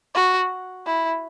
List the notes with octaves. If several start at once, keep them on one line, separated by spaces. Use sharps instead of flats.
F#4
E4